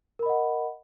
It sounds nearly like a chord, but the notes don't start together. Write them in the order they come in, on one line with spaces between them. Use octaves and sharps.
A#4 B5 D#5 F#5